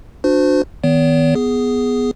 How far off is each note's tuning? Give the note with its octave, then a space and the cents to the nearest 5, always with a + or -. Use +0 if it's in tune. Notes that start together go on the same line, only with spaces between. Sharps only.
D4 +5 F#4 -25 C5 -30
D#3 +20 B3 +5 C#5 +45
B3 +0 G#4 +0